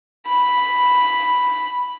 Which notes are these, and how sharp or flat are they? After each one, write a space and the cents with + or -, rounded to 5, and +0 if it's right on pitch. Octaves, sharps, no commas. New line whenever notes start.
B5 +0